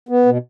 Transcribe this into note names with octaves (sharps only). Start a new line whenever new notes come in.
B3
B2